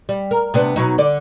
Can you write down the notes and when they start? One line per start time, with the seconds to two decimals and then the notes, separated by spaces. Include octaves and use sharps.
0.09 G3
0.31 A#4
0.54 C3 B3 D4
0.76 B2 F#3 D#4
0.98 D3 D5